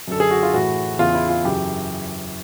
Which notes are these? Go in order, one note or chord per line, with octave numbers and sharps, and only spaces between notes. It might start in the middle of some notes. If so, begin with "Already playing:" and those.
F#2 D3 A4
G#4
F#4
F4
A2 E3 F#4
E2 C#3 E3 F4
E4
F4
F#2 C#3 E3 G4